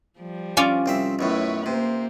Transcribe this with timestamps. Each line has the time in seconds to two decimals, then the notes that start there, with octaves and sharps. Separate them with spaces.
0.19 F3 G3
0.57 C#4 F4 D5
0.86 C2 C4 E5
1.19 B1 F#2 A2 E4 B4 C#5
1.66 C3 A#3 C5